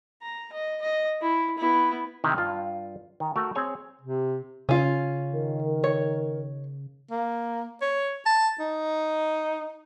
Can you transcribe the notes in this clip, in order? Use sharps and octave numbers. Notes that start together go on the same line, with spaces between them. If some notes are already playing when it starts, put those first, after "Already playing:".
A#5
D#5
D#5
E4
B3 E4
C3 D#3 D#4 E4
G2 F4
D#3
A3 F#4 A#4
C4 G#4 C#5 G#5
C3
C#3 C#4 F4
D#3 A#4
C#5
A#3
C#5
A5
D#4